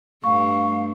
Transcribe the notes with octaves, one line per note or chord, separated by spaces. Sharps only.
G2 A3 F5 C#6